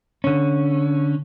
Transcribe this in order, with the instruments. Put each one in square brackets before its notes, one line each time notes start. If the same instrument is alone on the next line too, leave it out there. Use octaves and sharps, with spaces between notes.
[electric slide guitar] D3 C#4